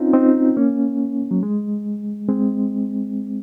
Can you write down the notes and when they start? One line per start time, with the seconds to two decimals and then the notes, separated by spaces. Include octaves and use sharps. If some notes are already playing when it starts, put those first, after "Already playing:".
Already playing: C4 C#4 D#4 F4
0.13 C4 D#4
0.57 A#3 C#4
1.31 F#3
1.43 G#3
2.29 G#3 C4